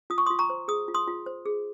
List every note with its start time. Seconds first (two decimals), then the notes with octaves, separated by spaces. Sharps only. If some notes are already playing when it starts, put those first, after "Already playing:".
0.10 F4 D#6
0.18 C#6
0.26 F4 C6 D#6
0.39 A#5 C#6
0.50 C5
0.68 G#4 D#6
0.88 F4
0.94 C6 D#6
1.08 F4
1.26 C5
1.46 G#4